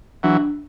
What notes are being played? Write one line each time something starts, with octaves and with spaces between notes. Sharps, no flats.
E3 F#3 D4